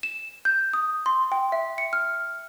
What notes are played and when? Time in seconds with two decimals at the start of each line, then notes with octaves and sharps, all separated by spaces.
0.03 E7
0.45 G6
0.73 D#6
1.06 C6
1.32 G5
1.52 E5
1.78 C#7
1.93 F6